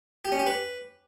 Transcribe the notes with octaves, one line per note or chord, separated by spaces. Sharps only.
G4
C#4
G4
B4